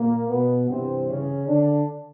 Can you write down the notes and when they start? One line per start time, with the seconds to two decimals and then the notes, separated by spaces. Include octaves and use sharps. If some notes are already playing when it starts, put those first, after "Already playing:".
Already playing: A#2 A#3
0.29 B2 B3
0.69 G2 C3 E3 G3 C4
1.08 C#3 C#4
1.48 D3 D4